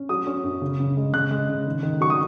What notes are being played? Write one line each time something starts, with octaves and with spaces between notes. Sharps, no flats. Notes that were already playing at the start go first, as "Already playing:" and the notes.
Already playing: C#4
F#3 D#6
C#4
F#2
C#3
C#3
G#3
C#3 F#6
G#3
C#3
D#3
D#3
F#3 C#6
D#6